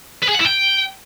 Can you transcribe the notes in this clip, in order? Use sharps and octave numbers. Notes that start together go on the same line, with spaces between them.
B4
G#4
F#5
E4
G5